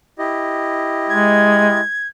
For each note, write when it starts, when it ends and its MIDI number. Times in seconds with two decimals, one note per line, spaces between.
0.19 1.80 64
0.19 1.80 67
0.19 1.80 75
1.09 1.81 56
1.09 2.08 92